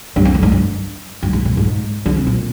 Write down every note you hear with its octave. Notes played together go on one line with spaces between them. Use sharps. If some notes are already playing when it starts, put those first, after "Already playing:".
G2
F2
G2
G#2
G2
G2
G#2
A#2
G#2
D3
C3
A#2